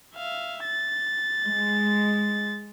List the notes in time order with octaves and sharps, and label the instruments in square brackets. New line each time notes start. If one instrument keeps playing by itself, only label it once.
[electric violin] E5 F5
A6
[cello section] G#3